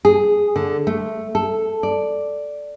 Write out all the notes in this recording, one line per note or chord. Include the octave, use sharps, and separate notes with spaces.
G#4
D3
A3
A4
D5